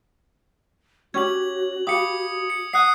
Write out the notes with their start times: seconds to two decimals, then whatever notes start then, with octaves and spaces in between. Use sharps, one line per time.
1.14 C#4 F#4 G4 G#6 F#7
1.87 G4 F5 B5 D#6 C#7
2.50 C#7
2.73 F#5 D#6 F#6 C7